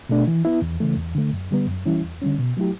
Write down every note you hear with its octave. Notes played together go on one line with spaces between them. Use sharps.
B2 A3 D4
E3
B3 E4
E2
C#3 E3 A3
E2
D3 A3
F#2
D3 G3 B3
F#2
E3 G3 C#4 E4
E2
D3 G3 C#4
B2
F#3 A3 E4 G4